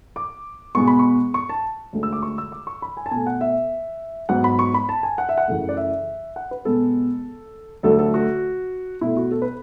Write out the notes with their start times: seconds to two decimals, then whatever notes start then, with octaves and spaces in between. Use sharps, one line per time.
0.16 D6
0.75 B2 G#3 B3 C#6
0.87 B5
0.99 C#6
1.34 C#6
1.49 A5
1.93 D2 D3 G#3
2.03 E6
2.13 D6
2.22 C#6
2.38 E6
2.52 D6
2.67 C#6
2.82 B5
2.97 G#5
3.06 A5
3.11 B2 A3 G#5
3.27 F#5
3.41 E5
4.29 G#2 F#3 B3 F#5
4.44 B5
4.59 C#6
4.74 B5
4.89 A5
5.03 G#5
5.18 F#5
5.29 E5
5.38 F#5
5.48 F#2 C#3 E3 A3
5.69 D5
5.77 E5
6.36 F#5
6.51 B4
6.65 B2 G#3 B3 A4
7.83 D2 D3 F#3 A3 A4
7.99 A4
8.14 F#4
9.01 B2 A3 E4
9.17 F#4
9.31 A4
9.42 B4